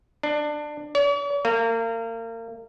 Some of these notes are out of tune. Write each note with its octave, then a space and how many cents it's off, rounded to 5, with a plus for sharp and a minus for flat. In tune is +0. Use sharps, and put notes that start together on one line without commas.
D4 +20
C#5 +45
A#3 -35